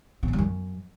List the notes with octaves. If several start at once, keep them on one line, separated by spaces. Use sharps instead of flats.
C3
B2
G3
F#2